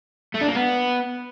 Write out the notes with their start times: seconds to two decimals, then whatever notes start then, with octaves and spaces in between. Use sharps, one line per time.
0.34 A3
0.41 D4
0.48 A#3
0.55 B3